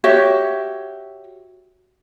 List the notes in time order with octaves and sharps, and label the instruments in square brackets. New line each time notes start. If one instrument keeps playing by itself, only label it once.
[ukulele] F#4 G4 C#5 E5